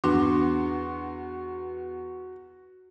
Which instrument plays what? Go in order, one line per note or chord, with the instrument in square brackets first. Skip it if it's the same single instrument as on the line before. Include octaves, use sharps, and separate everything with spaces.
[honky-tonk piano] E2 B3 C6 [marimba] D4 [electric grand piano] F#4